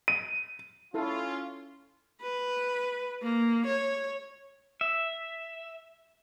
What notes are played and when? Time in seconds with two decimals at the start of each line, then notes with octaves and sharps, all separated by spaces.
0.08 D#7
0.94 C#4 E4 F4 A4
2.22 B4
3.22 A#3
3.67 C#5
4.81 E5